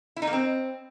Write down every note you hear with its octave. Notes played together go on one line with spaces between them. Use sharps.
E4
D#4
A#3
C4